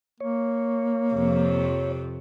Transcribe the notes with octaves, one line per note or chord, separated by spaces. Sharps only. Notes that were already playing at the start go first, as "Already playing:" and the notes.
A#3 C#5
F2 C3 F3